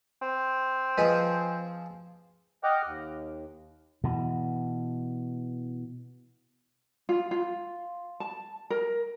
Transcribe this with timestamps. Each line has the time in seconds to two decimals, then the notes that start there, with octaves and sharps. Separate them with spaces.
0.22 C4
0.98 F3 G#4 B4 D#5
2.64 D#5 F#5 G5 D6 F6
2.85 D#2
4.04 B2 E3
7.09 F4
7.31 F4
8.20 A5
8.70 A#4